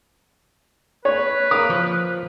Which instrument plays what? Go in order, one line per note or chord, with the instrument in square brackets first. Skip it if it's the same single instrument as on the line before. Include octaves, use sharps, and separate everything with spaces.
[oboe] B4 [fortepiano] C#5
[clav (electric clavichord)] A#4 F5 [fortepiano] D#6
[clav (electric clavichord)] F3